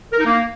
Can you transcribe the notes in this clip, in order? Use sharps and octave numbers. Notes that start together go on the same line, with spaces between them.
A#4
D#4
A#3